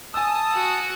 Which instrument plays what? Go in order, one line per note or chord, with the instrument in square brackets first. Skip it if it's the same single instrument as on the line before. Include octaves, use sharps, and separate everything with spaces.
[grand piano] G#5 E6 [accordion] A5 D#6
[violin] F#4